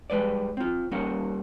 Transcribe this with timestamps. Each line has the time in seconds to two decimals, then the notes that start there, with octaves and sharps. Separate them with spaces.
0.10 G3 G#3 B4 D5
0.57 C4 F4
0.92 G3 A#3 C#4 A#4 F#5